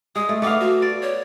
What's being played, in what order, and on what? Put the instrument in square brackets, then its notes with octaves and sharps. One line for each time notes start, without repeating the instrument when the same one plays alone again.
[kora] G#3 [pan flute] D#6
[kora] A3
[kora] A3 B3 F5 [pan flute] D6
[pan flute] F#4
[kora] D5
[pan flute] C#5